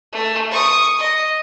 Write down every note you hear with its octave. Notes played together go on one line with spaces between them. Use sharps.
A3
C#6 D#6
D#5